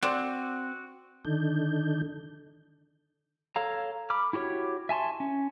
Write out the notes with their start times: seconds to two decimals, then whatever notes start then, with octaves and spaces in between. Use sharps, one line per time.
0.03 C4 F#4 C5 D5 D6
1.25 D3 D#3 D4 D#4 A4 G6
3.56 A4 C#5 F5 A#5
4.10 B5 D6 F6
4.33 E4 F#4 G4 C#5
4.89 E5 G#5 A5 C6 C#6
5.20 C#4